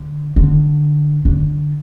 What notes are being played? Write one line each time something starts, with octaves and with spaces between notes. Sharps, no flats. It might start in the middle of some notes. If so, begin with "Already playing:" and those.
Already playing: D3
D3
D3